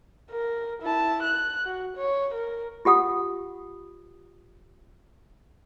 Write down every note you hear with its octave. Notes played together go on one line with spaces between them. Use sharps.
A#4
E4 A5
F#6
F#4
C#5
A#4
F4 G4 F#5 D#6